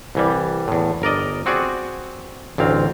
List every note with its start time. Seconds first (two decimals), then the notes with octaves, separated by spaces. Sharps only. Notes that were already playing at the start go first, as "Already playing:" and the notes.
0.15 C2 E3 G3
0.68 E2 A2
1.02 G1 A#4 D5 D#5
1.46 C4 F#4 G#4 D5
2.58 A1 D2 C4 F5